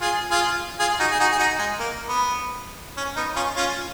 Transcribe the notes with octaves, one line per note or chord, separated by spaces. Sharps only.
F4 G#4
F4 G#4
F4 G#4
D#4 F#4
G#4
D#4 F#4
G#4
D#4 F#4
G#3
A#3
B3
C#4
B3 D#4
C#4 F4
C#4 F4